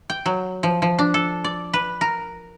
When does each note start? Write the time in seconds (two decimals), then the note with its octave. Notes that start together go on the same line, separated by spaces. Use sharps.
0.10 G5
0.26 F#3
0.63 F3
0.82 F3
0.99 D4
1.14 A4
1.44 D5
1.73 B4
2.01 A#4